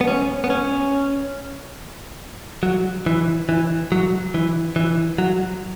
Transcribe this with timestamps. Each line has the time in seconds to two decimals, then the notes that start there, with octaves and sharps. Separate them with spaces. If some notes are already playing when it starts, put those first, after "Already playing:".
0.01 B3
0.07 C#4
0.44 B3
0.50 C#4
2.63 F#3
3.06 E3
3.49 E3
3.92 F#3
4.34 E3
4.76 E3
5.18 F#3